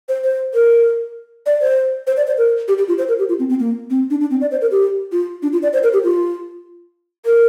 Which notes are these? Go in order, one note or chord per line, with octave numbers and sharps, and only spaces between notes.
C5
C5
A#4
D5
C5
C5
D5
C5
A#4
G4
G4
F4
C5
A#4
G4
F4
C4
C4
A#3
C4
D4
D4
C4
D5
C5
A#4
G4
F4
D4
F4
D5
C5
A#4
G4
F4
A#4